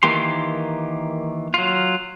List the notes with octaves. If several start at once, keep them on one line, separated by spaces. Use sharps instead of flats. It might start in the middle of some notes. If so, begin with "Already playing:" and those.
D#3 E3 A#3 G4 C6
F#3 F4